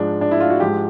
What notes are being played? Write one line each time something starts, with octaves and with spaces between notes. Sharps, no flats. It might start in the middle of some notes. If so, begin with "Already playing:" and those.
Already playing: G#2 F3 G#3 D4
D4
E4
F4
F#4
G#2 F3 G#3 G4